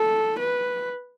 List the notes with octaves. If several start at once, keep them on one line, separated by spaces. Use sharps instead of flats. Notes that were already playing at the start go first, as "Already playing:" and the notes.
Already playing: A4
B4